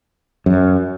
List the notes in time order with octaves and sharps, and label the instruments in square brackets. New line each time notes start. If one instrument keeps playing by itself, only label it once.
[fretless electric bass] F#2